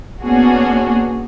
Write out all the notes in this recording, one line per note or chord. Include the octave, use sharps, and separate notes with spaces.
A#3 B3 C#4 D4 F#4 G#4